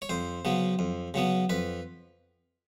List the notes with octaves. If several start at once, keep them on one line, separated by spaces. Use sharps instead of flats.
C#5
F2 C5
C#3 F#3 B3
F2
C#3 F#3 B3
F2 B4